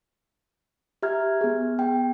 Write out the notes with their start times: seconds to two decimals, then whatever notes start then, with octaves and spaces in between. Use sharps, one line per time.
1.03 G4 E5 A#5 F6 G#6
1.41 B3 G#4
1.78 B3 G5